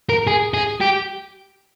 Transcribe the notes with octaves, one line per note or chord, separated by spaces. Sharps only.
A#4
G#4
G#4
G4